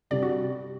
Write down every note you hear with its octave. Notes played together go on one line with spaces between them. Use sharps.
C3 G3 D4 G4 D5
F#4